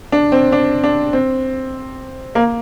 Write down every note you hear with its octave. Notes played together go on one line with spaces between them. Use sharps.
D4
C4
D4
D4
C4
A#3